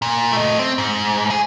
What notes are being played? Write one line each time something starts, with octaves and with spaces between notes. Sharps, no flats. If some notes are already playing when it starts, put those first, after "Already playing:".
A#2
A3 D#5
C4
G#2
G#4